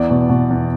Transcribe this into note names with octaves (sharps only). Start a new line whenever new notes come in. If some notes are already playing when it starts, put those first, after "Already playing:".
Already playing: E2 D5
B2
B2
E2